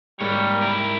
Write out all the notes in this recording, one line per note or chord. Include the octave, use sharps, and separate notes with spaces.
G#2 G3 A#3 C#5
E4 A#4